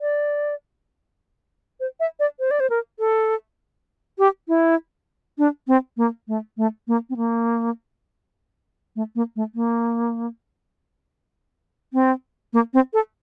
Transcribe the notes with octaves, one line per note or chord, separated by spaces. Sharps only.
D5
C5
E5
D5
C5
D5
C5
A#4
A4
G4
E4
D4
C4
A#3
A3
A3
A#3
C4
A#3
A3
A#3
A3
A#3
C4
A#3
C4
A4